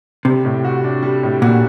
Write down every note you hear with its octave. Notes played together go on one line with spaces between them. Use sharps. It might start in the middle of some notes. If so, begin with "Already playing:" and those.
C3 G3
A2
F#4
D4
G3
A2
A#2 F#4